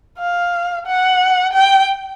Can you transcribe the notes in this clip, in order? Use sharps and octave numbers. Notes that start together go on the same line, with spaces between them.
F5
F#5
G5